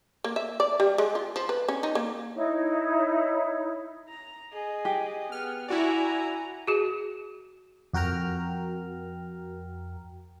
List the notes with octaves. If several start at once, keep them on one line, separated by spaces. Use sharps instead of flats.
A#3
E5
D5
G3
G#3
F4
F3
B4
C#4
D#4
A#3
D#4 E4 C#5
A#5
G#4 D#5
G4
B3 G#4 F6
E4 F#4 D5 G#5 A#5
F#4 G#4
F2 F#4 A#4 G5 A#5 F6